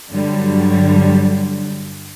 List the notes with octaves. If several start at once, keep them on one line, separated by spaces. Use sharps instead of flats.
G2 D3 F#3 G3